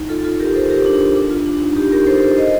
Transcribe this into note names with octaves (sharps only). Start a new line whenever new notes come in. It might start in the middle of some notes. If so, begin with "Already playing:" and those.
Already playing: D#4
F4 A4
F4 A4
G4 A#4
A4 C5
G4 A#4
D4
D4
F4
D4
D#4
D#4 G4
G4 A#4
A4 C5
A4 C5
C5 D#5